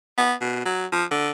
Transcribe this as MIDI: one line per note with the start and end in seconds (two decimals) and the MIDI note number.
0.18 0.34 59
0.41 0.63 47
0.65 0.86 54
0.92 1.05 53
1.11 1.31 50